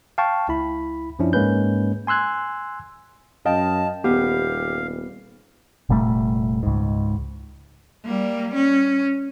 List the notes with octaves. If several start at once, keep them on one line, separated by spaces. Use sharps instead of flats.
F5 G5 A5 C#6
C#2 E4 B5
F#2 F3 C#4 D4 E4
G#2 G#3 A#3 C#4 B4 G6
G#5 C6 E6 F#6 G#6
F#2 D#5 F5 G5 A5
D#1 B3 G4 F5
F1 A#2 G3 A3
C#2 G#2
G3 A#3
C#4